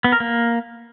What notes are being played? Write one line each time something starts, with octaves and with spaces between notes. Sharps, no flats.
B3
A#4
A#3